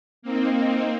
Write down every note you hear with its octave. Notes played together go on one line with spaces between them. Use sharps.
A#3 C4 D#4